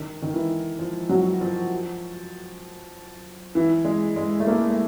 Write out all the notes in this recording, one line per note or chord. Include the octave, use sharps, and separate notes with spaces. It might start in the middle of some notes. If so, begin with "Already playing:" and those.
Already playing: D#3
D#3
E3
F3
F#3
F3
E3
G#3
G#3
A3
A#3
A3